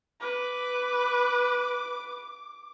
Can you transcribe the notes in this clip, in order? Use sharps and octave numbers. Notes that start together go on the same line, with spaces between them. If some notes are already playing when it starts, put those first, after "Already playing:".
B4 D6